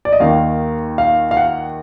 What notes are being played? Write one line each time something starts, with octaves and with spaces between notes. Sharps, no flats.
D5
D#5
D#2 D#3 F5
F5
F5
F#5